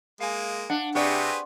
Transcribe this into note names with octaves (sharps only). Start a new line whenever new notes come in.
G#3 A#3 F5 G#5
D4 F#5
C3 G4 G#4 B4 D5 F#5 C#6